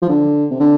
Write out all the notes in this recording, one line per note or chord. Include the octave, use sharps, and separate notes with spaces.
F3
D3
C3
D3